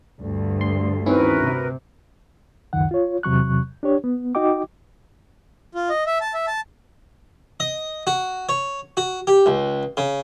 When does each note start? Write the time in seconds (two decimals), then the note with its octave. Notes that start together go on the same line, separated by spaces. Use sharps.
0.20 D2 G2
0.61 C6
1.06 D#3 C4 C#4 E4 F#4 A#4 B4
1.43 C3
2.73 C#2 F#2 D#3 F#5
2.91 F4 C#5
3.23 E2 C3 F#3 C#6 F#6
3.83 D4 G4 C#5
4.04 B3
4.35 D#4 F#4 D#5 G5 D6
5.75 F4
5.90 D#5
6.07 E5
6.21 A5
6.34 E5
6.47 A5
7.60 D#5
8.07 F#4
8.49 C#5
8.97 F#4
9.27 G4
9.46 C#2
9.97 C#3